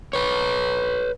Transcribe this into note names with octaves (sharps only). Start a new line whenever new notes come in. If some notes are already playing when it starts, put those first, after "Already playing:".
B4 C#5